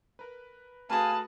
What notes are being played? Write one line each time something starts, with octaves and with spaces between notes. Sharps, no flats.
A#4 B4
A3 F#4 G#4 B4 F5 G#5 A5 D#6